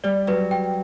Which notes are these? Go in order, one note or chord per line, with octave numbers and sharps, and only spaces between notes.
G3 D5
F#3 B4
G5